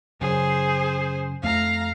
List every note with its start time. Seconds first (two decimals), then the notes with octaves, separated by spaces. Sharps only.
0.21 F#2 C#3 G#4 C5
1.43 F2 A3 F5 A#5